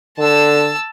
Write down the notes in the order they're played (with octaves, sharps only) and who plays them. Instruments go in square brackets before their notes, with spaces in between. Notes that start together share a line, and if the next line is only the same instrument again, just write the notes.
[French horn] D3 [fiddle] A5 E6